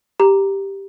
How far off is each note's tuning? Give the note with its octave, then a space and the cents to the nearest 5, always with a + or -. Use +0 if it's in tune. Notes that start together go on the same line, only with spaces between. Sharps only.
G4 +0 A#5 +0